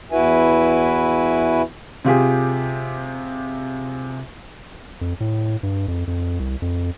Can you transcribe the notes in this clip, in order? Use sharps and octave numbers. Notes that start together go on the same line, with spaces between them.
E2 E4 F#4 B4 E5 G#5
C3 F4 G4 G#4
F2
A2
G2
F2
F2
C2
F2